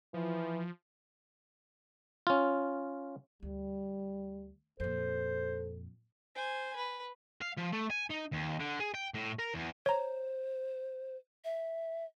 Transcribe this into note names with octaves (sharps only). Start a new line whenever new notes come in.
E3 F3
C#4 F4
D2 G3
F2 A#2 A4 C5
C5 G#5
B4
F5
F3
A3
G#5
D#4
D#2
D3
G#4
G5
A2
A#4
E2
C5 C#5 A#5
E5